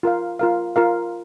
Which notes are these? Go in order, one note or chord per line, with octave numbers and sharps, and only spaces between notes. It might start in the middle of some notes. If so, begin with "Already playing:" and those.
F4 A#4 F5
F4 A#4 F5
F4 A#4 F5